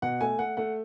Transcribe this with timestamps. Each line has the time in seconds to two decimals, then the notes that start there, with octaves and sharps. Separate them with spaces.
0.02 B2 F#5
0.21 A3 G#5
0.39 A3 F#5
0.57 A3 F#5